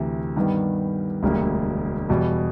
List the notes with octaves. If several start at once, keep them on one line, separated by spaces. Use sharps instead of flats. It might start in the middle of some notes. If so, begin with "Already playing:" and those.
Already playing: D2 C3 E3
G2 D#3 G3 B3
E1 D2 D3 G3 A#3
E2 B2 G3